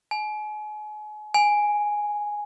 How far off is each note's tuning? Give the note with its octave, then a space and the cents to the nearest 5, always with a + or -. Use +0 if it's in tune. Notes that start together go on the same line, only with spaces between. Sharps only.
G#5 +35
G#5 +0